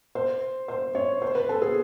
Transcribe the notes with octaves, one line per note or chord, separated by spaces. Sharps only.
C5
C5
C#5
C5
B4
A4
G#4